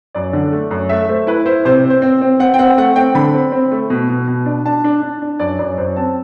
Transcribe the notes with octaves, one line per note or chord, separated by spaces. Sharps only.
F#2 D5
D3
A3
F#2
A3 E5
A3 C5
E4 B4
E4 C5
C3 C5
C4
C5
C4
C4
C4 F#5
G5
C4 F#5
A3 F#5
C4 G5
D3 B5
C4
C4
A3
B2
B2
B2
D4
D4 A5
D4
D4
D4
F#2 D5
F#2 D5
F#2 C5
C4 A5